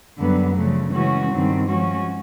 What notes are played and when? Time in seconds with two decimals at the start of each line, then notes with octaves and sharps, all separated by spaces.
0.19 F#2 D3 G3 B3
0.56 C#3 F3 A3
0.93 C#3 E3 G#3 C#4 F#4
1.31 G2 D#3 G3 C4
1.68 F3 G#3 C#4 F#4